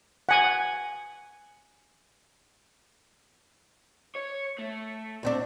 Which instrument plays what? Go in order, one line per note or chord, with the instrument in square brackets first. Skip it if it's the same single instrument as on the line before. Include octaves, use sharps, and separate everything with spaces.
[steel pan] F#5 G#5
[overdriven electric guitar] C#5
A3
[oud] D2 C4 D4